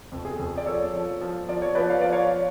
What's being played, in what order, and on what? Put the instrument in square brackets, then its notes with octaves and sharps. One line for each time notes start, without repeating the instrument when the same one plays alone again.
[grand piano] F2
G#4
F2
D5
F3 A4 C#5
F3
F3
F3 D5
C#5
F3 B4 D5
F5
F3 D5
C#5 F5